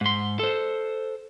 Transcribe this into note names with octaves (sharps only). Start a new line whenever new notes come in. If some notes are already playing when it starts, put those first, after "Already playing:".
G#2 C6
A4 C5